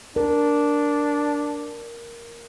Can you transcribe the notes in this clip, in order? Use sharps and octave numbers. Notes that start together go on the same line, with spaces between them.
D4 A#4